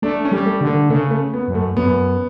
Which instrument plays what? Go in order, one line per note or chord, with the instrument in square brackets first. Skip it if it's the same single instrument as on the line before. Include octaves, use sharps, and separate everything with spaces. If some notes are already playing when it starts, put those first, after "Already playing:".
[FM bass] A3 [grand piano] D4
[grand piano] C#4
[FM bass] G3
[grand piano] A3
[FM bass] D3
[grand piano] A3
[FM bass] C#3 [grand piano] A3
[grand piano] A3
B3
[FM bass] F#2
[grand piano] A3
[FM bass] F#2 [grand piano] B3